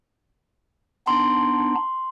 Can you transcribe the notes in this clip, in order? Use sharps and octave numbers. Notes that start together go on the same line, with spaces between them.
B3 D4 D#4 C6